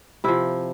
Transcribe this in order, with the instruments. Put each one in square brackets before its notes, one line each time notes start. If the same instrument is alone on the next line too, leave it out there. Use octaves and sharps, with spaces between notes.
[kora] C3 F3 E4